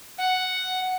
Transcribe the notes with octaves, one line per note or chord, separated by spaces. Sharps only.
F#5